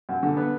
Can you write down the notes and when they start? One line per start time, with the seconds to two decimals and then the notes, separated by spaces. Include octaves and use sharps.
0.09 F#2
0.23 D3
0.37 B3